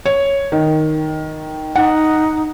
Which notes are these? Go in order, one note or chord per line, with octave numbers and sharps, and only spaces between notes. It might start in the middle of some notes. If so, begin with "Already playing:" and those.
C#5
D#3
D#4 F#5